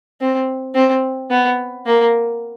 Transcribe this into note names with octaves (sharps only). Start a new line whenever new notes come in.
C4
C4
B3
A#3